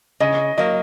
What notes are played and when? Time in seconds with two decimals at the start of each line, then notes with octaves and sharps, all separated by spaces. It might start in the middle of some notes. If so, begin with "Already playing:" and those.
0.20 C#3 D#5
0.58 F#3 A#3 D#5